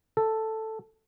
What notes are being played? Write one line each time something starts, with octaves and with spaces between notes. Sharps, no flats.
A4